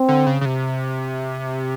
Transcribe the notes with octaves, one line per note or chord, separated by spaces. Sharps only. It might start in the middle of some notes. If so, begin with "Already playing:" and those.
Already playing: C4
D3
C#3
C#3
C3